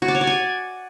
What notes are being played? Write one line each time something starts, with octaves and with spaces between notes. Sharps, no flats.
F#4
D5
C#5
D5
G#5